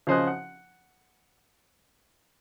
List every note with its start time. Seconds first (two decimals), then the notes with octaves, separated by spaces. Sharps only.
0.07 C#3 F3 C5 D#5 G#5 F#6
0.27 F#5